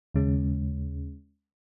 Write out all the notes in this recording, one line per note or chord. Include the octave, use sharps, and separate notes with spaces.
D#2 C#3 G#3 C#4